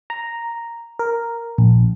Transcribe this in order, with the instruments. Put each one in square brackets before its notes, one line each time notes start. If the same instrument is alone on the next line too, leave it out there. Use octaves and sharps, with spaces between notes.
[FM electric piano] A#5
A#4
A#1